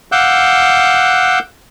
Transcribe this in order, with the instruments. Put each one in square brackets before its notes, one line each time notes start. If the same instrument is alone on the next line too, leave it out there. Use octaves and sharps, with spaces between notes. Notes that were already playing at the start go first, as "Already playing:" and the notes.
[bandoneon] F5 F#5 D6 E6 F#6 G6